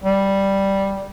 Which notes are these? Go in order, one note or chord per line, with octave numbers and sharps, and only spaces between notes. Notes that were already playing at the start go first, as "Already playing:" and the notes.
G3